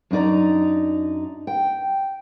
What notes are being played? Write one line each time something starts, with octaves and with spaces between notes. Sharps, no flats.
F#2 D4 D#4 D5 A#5
G5